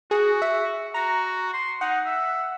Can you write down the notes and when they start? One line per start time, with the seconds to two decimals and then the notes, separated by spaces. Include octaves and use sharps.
0.11 F#4 G#4
0.42 E5
0.94 F#4 A#5
1.53 C6
1.81 D#4 F#5
2.05 E5